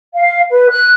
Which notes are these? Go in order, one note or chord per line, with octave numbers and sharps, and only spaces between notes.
F5
B4
F#6